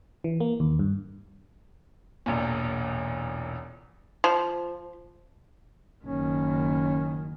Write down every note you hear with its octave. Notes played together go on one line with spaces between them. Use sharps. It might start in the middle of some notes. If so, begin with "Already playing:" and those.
E3
A#3
D#2
G2
E1 A1 E2 A#2
F3
F#1 D#3 C#4